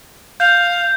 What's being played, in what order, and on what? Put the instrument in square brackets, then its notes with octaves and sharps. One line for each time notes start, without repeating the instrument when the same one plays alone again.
[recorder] F5 [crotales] G6